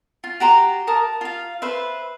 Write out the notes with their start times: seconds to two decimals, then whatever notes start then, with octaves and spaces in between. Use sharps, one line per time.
0.24 F4
0.40 F#4 G4 A#5 C6
0.87 A#4 A5 D#6
1.21 F4 F5
1.62 B4 C5 E5